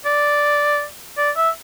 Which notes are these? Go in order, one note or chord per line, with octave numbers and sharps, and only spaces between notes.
D5
D5
E5